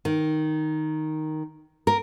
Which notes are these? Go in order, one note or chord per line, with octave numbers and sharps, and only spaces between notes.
D#3
A#4